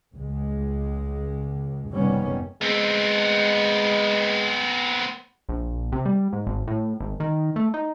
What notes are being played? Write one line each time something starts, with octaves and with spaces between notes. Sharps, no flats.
C#2 G#3
F#1 C3 D#3 G3 B3 C#4
G#3 B3 C4
A#1
C3
G3
G#2
G#1
A2
G#1
D#3
A3
D#4